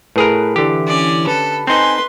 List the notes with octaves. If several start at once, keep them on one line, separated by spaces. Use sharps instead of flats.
A2 G#4 A#4 B4
D3 E3 G4
C#4 D5
A4 B4
C4 D#4 B4 G#5 C6